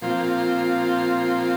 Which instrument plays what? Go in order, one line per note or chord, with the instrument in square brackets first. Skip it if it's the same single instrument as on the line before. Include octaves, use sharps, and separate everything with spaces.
[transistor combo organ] A#2 F3 C4 F4